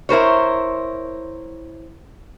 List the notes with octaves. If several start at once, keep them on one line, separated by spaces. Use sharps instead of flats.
E4 A#4 C5 C#5